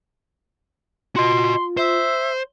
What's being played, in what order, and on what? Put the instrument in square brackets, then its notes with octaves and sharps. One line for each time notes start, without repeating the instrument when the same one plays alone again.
[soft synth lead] F4 [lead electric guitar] F#4 D#5 [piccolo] C6
[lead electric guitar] C5 [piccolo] E5